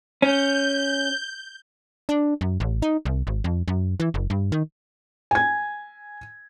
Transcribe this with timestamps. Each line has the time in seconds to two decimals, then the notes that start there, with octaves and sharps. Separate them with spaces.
0.22 C#4 G6
2.09 D4
2.41 F#2
2.60 A1
2.82 D#4
3.05 C2
3.27 G#1
3.44 F2
3.68 F#2
4.00 E3
4.14 F#1
4.30 G2
4.52 D#3
5.31 G#5 G#6